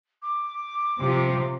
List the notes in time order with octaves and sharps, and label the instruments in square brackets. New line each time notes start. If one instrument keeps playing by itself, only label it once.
[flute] D6
[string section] C3 F3